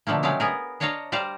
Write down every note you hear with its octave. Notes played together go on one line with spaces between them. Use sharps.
B2 D3 F3 A3 A#3
C#3 F#3 G#3 A3 G4 F5
B3 G#4 A#4
D4 C#5 D#5 F5 A5 A#5
G3 C5 D5 F5 A#5